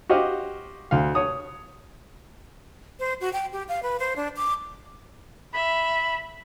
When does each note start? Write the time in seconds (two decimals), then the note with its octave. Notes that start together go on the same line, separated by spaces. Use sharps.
0.09 F#4 G4 C5 D#5 F5
0.91 D2 F5
1.15 C#5 D#6
3.00 C5
3.21 F#4
3.33 G5
3.53 G4
3.69 F5
3.83 B4
4.00 C5
4.16 D4
4.36 D6
5.54 E5 B5